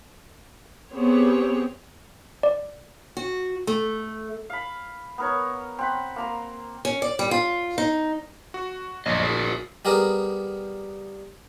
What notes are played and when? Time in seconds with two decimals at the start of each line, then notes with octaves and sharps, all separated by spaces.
0.93 B3 C4 G4 G#4 C#5
2.43 D5
3.17 F#4
3.67 A3
4.50 F5 B5
5.18 B3 A#4 C#5
5.79 C4 F#5 B5
6.16 A#3 A#5 C6
6.85 C#4
7.02 D5
7.19 G3
7.31 F4
7.78 D#4
8.54 F#4
9.06 A#1 F#2 C#5 D#5
9.23 F#4 G#4 A#4
9.85 G3 B3 G#4 A#4